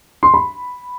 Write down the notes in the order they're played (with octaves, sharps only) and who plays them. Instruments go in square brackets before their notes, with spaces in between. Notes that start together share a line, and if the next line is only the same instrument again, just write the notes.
[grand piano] C6
B5